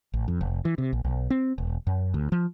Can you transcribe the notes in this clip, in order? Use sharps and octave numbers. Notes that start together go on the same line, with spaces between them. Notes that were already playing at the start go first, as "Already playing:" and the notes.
A1
F2
F1
E3
C3
A#1
B1
C4
E1
F#2
D2
F3